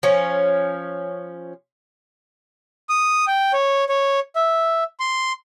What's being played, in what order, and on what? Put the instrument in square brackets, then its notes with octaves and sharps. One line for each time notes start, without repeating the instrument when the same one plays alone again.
[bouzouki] F3 C#4
[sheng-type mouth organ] D#6
G5
C#5
C#5
E5
C6